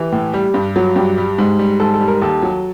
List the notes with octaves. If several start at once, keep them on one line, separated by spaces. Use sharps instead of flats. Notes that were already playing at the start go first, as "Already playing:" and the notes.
Already playing: E3 G4
A2
G3
G2
F#3
G2 G4
G3
G#2
G3
G#2 A4
A4
G3
A#4
D#2 A4
F#3